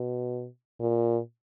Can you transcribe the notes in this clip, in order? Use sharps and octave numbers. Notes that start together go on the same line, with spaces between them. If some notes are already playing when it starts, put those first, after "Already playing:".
Already playing: B2
A#2